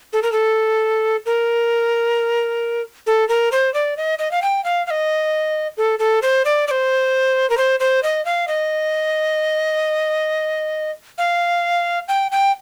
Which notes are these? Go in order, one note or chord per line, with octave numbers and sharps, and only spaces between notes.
A4
A#4
A4
A#4
A4
A#4
C5
D5
D#5
D#5
F5
G5
F5
F5
D#5
A4
A4
C5
D5
D5
C5
A#4
C5
C5
D#5
F5
D#5
F5
G5
G5